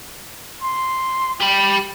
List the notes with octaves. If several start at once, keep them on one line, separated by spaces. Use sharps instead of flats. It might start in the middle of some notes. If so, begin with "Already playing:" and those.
C6
G4 G5 B5